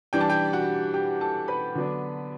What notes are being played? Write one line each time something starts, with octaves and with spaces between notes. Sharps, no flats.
E3 G3 D4 G5
A5
G4 G5
F#4 F#5
G4 G5
A4 A5
B4 B5
D3 F#3 B3 D4